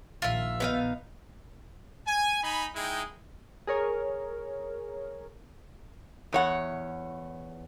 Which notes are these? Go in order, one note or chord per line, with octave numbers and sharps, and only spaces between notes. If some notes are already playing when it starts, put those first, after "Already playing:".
A#1 D#3 F4 E5
B3 D#4 F5
G#5
D#4 G#5 B5
G#3 D#4 E4 G#4 G5
G#4 A#4 C#5
E2 C#5 F#5